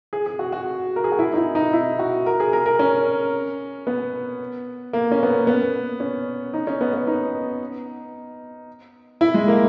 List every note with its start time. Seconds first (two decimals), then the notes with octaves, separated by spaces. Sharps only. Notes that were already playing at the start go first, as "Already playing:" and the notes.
0.13 G#4
0.26 G#4
0.39 F#4
0.52 F#4
0.96 A#4
1.04 G#4
1.12 F#4
1.19 E4
1.33 D#4
1.37 E4
1.55 D#4
1.73 E4
1.99 F#4
2.26 A#4
2.40 G#4
2.53 A#4
2.66 A#4
2.79 C#4
3.87 B3
4.93 A#3
5.11 C#4
5.23 B3
5.29 A#3
5.47 B3
6.00 C#4
6.54 D#4
6.67 C#4
6.81 B3
6.94 B3
7.07 D#4
9.21 E4
9.34 G#3
9.48 A#3